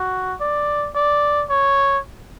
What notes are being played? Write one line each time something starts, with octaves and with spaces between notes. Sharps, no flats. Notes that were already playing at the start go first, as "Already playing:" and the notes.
Already playing: F#4
D5
D5
C#5